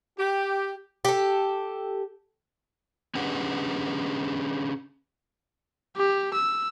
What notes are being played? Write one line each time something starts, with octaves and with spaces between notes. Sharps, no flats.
G4
G4 A4
C#4 D4 G4 G#4 B4 F#5
G4
E6